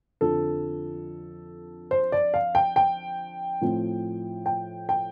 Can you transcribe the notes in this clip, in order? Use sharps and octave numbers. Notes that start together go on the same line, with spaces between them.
F2 D3 F3 A4
C5
D5
F5
G5
G5
A2 F3 C4
G5
G5